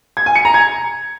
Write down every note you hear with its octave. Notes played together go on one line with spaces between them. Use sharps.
G#6
G#5
C#7
A#5
G#6